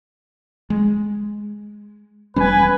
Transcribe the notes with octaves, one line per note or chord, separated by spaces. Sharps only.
G#3
E1 G3 C#4 B4 G#5